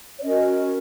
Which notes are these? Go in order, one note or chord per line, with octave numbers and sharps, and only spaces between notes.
C#5
C#4 F#4 A#4 D#5